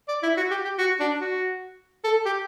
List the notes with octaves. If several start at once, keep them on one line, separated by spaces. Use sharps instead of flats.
D5
E4
F#4
G4
G4
F#4
D4
F#4
A4
G4